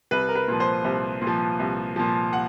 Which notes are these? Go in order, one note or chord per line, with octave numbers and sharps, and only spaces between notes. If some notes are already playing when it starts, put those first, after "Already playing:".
C2 B4
A#4
B4
A#2 F3
C5
C2 C5
A#2
F3
C2
A#2 F3
F#5